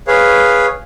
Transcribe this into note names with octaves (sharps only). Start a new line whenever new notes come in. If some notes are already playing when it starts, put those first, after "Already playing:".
G#4 B4 C#5 F5